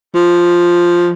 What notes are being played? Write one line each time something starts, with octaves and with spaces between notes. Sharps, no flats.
F3